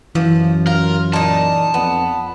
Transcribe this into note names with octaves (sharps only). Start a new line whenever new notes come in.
F#2 E3 F3
F4 A#4
A#2 D#4 A5
F2 B3